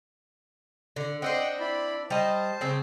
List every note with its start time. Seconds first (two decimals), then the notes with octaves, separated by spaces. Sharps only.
0.96 D3
1.22 C4 D4 C5 D#5 F#5 G5
1.60 E4 D5 B5
2.10 G3 C5 D#5 A5
2.61 C#3 C4